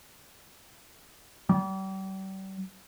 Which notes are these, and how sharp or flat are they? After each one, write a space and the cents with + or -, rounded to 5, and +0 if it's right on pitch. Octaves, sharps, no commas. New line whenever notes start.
G3 -40